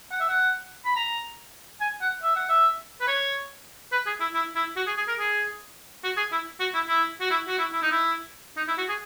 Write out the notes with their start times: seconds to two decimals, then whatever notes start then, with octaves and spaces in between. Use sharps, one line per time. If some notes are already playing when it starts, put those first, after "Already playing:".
0.11 F#5
0.20 E5
0.29 F#5
0.85 B5
0.96 A#5
1.81 G#5
2.01 F#5
2.23 E5
2.36 F#5
2.49 E5
3.01 B4
3.07 C#5
3.92 B4
4.06 G#4
4.20 E4
4.34 E4
4.55 E4
4.76 F#4
4.87 G#4
4.97 G#4
5.08 A#4
5.19 G#4
6.04 F#4
6.17 G#4
6.32 E4
6.60 F#4
6.74 E4
6.88 E4
7.21 F#4
7.30 E4
7.48 F#4
7.58 E4
7.73 E4
7.82 D#4
7.91 E4
8.57 D#4
8.68 E4
8.78 F#4
8.89 G#4